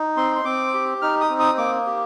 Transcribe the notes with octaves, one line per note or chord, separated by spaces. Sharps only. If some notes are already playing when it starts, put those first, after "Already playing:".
Already playing: D#4
C4 C6
C6
C4 D6
G4
D#4 F6
D#6
C4
D#6
A#3 D6
G4